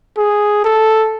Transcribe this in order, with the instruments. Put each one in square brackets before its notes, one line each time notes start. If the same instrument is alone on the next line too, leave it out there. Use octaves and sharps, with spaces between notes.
[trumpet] G#4
A4